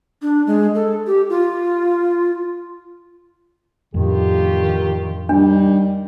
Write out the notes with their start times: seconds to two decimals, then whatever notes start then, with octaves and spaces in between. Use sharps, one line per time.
0.22 D4
0.47 G#3
0.75 A4
1.07 G4
1.30 F4
3.94 F2 A2 D3 D#3 F4 G4
5.29 D#3 G3 D4